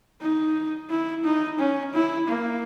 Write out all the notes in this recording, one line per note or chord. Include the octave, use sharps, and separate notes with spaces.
D#4
E4
D#4
C#4
E4
A#3